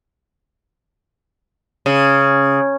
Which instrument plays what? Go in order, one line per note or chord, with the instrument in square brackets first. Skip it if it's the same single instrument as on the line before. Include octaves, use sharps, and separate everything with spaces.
[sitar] C#3